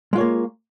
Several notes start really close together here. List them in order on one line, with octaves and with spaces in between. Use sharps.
G#3 F4 C#5 A#3